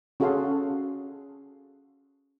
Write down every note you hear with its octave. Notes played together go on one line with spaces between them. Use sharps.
C#4 F#4 G#4 A4 F5 C6